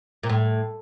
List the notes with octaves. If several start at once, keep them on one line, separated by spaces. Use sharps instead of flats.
A#2
A2